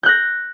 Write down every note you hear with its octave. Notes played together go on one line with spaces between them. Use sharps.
F#6 G6 A#6